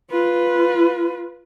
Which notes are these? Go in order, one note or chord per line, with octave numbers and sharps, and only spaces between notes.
F4 B4